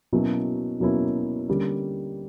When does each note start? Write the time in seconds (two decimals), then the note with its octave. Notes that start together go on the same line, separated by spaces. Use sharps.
0.13 B2 F#3 A#3 C#4 E4
0.80 B2 F#3 A#3 C#4 E4
1.48 D3 G3 A#3 C#4